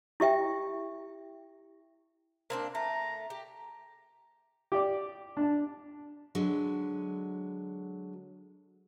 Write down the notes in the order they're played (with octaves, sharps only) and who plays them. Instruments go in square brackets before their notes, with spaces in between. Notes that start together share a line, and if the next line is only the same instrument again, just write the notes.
[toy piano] E4 G4 E5 G5
[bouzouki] A#3 C4 D4
[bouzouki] A3 [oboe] A#5
[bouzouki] G4
[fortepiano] G4 D5 D6
D4 A5
[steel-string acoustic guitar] D3 F#3 G#3